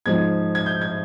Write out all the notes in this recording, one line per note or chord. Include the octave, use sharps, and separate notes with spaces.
G#2 F3 G#3 G#6
G#6
G6
G#6